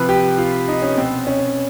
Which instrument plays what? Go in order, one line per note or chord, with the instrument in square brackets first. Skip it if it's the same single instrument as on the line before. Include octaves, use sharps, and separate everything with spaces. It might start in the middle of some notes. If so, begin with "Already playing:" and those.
Already playing: [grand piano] C3 F3 B4
G4
F4
D#4
C#4
B2 C4
C#4